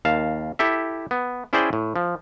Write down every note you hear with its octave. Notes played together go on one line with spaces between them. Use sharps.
D#2 F5 A5
E4 G4 A4 E5
B3
C#4 E4 G#4 C5 D5 G5
A2
F3